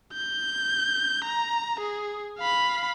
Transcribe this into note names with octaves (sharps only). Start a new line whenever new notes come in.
G6
A#5
G#4
F5 B5